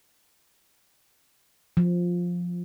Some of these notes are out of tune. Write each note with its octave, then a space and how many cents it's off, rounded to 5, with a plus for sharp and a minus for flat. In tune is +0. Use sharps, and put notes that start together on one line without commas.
F3 +10